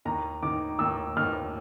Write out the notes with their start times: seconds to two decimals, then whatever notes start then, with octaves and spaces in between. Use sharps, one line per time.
0.05 D#2 A#5
0.42 D#3 D6
0.79 D#2 E6
1.17 D#2 F6